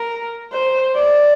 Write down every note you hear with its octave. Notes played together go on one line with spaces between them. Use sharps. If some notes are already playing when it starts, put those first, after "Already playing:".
Already playing: A#4
C5
D5